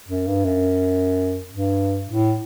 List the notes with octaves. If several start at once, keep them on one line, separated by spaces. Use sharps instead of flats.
F#2
G2
F#2
G2
A2